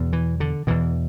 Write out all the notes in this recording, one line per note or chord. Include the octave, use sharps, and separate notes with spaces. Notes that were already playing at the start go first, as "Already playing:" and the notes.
Already playing: E2 B2
E3
D3
E2 B2 E3